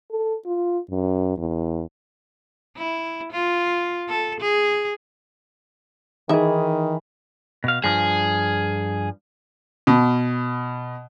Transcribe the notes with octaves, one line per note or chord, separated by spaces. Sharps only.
A4
F4
F#2
E2
E4
F4
A4
G#4
D#3 E3 D#4 G#4 E5
B2 F5
G2 F3 G#4
B2